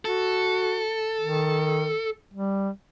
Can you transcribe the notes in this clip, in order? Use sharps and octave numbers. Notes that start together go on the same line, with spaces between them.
F#4 A4
D#3
G3